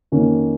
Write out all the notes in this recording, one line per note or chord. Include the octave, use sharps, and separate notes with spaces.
F2 D#3 A#3 C#4